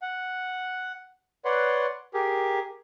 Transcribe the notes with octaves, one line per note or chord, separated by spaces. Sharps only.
F#5
B4 C#5 D5 F#5 C6
G4 G#4 A#4